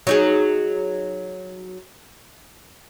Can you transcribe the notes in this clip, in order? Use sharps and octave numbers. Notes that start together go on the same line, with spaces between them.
F#3 D#4 G#4